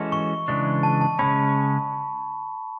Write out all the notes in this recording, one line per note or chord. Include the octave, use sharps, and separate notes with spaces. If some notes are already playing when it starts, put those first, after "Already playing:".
Already playing: E3 G#3 C#4 F#4 A4
C#6
C#3 E3 G#3 D4
A5
A5
C#3 G#3 C#4 B5